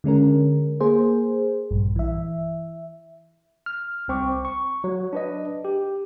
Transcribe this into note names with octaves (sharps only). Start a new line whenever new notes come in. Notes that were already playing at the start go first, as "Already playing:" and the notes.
D3 G#3 C#4 A#4
A#3 G#4 C5
A#1 G2
E3 E5
F6
C2 C4 C#6 D6
C#6
F#3
D4 B4 D#5
G4